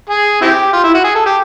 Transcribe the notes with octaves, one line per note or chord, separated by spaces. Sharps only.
G#4
C4 E4 G4
F4
E4
F#4
G#4
A4
G4